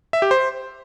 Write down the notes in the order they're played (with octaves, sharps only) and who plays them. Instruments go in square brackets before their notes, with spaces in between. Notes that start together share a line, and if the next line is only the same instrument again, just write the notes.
[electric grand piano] E5
G4
C5